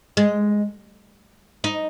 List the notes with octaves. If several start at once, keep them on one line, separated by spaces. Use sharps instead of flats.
G#3
D#4